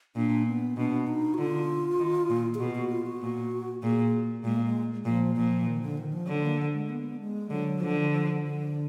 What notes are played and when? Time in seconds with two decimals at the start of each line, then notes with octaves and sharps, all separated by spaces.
0.16 A#2 D4
0.47 B3
0.77 B2 D4
1.07 D#4
1.34 F#4
1.38 D3 F4
1.99 D#3
2.30 A#2
2.55 G#4
2.60 B2 F#4
2.75 F#4
2.92 F4
3.06 F#4
3.22 A#2
3.83 A#2 G#4
4.44 A#2 G#3
4.56 A#3
4.64 G#3
5.05 A#2 F3
5.36 A#2 F3
5.66 D#3
5.81 D3
5.98 D#3
6.13 F3
6.28 D3 F#3
6.43 A#3
6.74 G#3
6.89 B3
7.20 G#3
7.50 D3 F#3
7.80 D3 F3
8.11 F3
8.43 D3